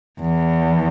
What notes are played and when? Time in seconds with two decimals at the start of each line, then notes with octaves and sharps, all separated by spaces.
0.21 E2